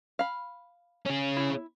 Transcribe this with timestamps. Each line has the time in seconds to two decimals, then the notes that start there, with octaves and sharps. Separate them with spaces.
0.19 F5 B5
1.06 C#4 G#4
1.37 E4